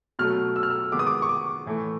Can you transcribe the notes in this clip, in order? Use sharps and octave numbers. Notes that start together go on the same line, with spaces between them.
B2 F#3 A3 F6
E6
F6
E6
D#3 G#3 B3 D6
D#6
D6
C#6
D6
A2 E3 A3